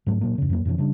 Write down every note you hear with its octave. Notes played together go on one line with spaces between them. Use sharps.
G#2 F#3 A3
A#2 F#3 A#3
E2 C#3
F2 F#3 A#3
F2 B2 E3 C#4
C#3 G3 D4